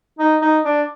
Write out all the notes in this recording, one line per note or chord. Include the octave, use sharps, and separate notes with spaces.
D#4
D#4
D4